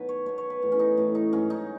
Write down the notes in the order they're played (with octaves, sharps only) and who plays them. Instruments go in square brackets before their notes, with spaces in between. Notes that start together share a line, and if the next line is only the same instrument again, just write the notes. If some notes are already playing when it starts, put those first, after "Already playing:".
Already playing: [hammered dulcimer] B2 D#3 F#3 B4
C#5
B2 F#3 C#5
C#5
B4
A2 E3
C#4
D#4
A2 E3
D#4
G#2 F#3 C#4
D#4